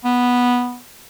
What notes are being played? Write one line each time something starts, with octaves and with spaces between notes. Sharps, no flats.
B3